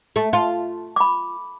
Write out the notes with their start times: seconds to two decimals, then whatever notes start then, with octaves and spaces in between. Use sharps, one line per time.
0.16 A3
0.33 F4
0.96 B5 D6